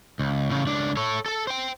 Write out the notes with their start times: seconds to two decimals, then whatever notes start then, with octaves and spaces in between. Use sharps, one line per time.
0.19 C#2
0.50 A2 C#3
0.67 C#2 D4
0.97 A4 C#5
1.26 A4 A5
1.47 C5 G5